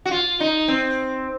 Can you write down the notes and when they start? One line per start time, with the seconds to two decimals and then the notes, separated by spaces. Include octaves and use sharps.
0.05 F#4
0.11 F4
0.40 D#4
0.68 C4